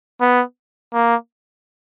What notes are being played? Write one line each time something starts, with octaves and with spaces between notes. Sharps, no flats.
B3
A#3